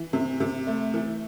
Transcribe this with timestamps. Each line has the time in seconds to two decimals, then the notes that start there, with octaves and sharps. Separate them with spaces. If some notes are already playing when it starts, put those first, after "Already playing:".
Already playing: E3
0.13 C3
0.40 C3
0.67 A3
0.94 E3